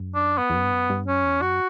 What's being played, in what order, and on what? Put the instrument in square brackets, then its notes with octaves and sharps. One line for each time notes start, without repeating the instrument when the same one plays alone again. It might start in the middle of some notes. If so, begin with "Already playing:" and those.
Already playing: [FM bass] F#2
[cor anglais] D4
B3
[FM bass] E2
F#2
G2
F#2
G2
[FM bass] F#2 [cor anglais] C#4
[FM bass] E2
[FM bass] F#2 [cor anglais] F#4